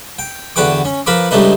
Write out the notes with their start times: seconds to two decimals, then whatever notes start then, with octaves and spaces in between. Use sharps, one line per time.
0.19 G5
0.56 E2 D3 F#4 B4 G5 D6
0.85 C#4
1.06 F3 A#4 B4 B5 D6
1.31 C#2 G2 A3 D4 D#4 B4